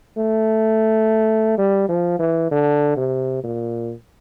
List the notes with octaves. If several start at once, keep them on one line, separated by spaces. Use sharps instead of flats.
A3
G3
F3
E3
D3
C3
A#2